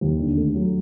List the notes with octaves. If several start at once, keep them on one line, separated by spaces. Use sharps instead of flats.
D#2
D3
A3
F#3